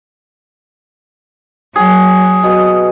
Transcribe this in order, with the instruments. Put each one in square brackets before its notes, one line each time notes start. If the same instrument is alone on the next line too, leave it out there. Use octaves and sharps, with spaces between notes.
[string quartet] F#3 [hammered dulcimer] G#4
[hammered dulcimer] B2